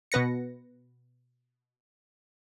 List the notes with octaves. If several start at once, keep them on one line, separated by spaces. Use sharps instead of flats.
B2 B3 B4 A#6 C#7